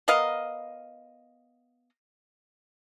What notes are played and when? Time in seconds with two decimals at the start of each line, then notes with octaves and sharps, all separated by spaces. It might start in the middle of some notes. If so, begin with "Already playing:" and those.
0.08 B3 A#4 D#5 F5